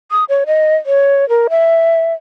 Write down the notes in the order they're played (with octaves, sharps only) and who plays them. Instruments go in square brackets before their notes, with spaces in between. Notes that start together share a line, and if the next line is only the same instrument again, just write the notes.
[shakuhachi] D#6
C#5
D#5
C#5
A#4
E5